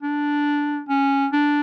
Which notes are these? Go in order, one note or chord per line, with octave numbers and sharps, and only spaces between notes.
D4
C#4
D4